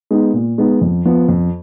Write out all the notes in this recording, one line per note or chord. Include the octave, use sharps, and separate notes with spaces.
G#3 B3 D#4
A#2
G#3 B3 D#4
F2
F3 B3
F2